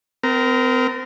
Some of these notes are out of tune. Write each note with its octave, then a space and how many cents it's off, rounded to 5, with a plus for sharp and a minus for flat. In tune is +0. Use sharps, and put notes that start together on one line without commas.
C4 -40 A#4 +0